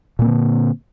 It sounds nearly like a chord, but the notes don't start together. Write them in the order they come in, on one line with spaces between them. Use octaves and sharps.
A#2 A#3 C4 D3